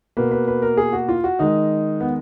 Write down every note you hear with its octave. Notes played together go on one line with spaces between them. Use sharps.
B2 A#3 B4
B4
B4
A#4
G#4
F#4
F4
F#4
D#3 G#3 D#4
B3